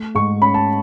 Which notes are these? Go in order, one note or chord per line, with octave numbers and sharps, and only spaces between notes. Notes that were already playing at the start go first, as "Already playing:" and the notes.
Already playing: A3
G#2 C#6
C#4 B5
A5